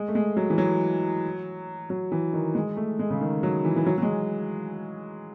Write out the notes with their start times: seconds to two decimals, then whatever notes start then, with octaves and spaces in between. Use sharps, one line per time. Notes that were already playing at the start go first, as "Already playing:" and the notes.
Already playing: G#3
0.08 A3
0.15 G#3
0.37 F#3
0.50 E3
0.58 F#3
1.90 F#3
2.12 E3
2.33 D#3
2.55 G#3
2.76 A3
2.99 G#3
3.10 C#3
3.21 D#3
3.43 F#3
3.65 E3
3.76 E3
3.86 F#3
3.98 F#3
4.02 G#3